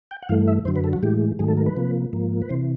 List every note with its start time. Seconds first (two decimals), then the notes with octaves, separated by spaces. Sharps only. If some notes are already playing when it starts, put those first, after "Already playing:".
0.11 G5
0.22 F#5
0.29 G2 E3 A3 F5
0.48 E5
0.65 F#2 D3 F#3 C5
0.76 B4
0.84 A4
0.93 F#4
1.03 A2 E3 G#3 G4
1.39 G#2 D#3 F#3 A3 G#4
1.48 A4
1.57 A#4
1.66 B4
1.77 C3 F3 A#3
2.13 G#2 F3 A#3
2.42 B4
2.49 C3 E3 C5